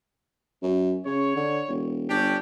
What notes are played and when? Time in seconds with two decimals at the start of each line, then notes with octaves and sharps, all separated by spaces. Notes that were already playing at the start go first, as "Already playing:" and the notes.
0.62 F#2
1.06 C#3 C#5
1.36 D3
1.68 E1
2.10 G1 C#4 D4 G4